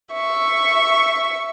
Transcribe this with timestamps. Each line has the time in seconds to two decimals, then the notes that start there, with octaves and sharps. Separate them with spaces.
0.13 E5 C#6